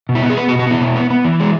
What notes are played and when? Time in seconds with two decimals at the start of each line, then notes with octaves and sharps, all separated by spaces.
0.09 B2
0.15 E4
0.23 B3 F#4
0.30 G#4
0.37 B3 B4
0.49 F#4
0.52 B2
0.59 F#4
0.67 B3 E4
0.81 B2
0.96 B3
1.10 B3
1.25 E3
1.40 G#3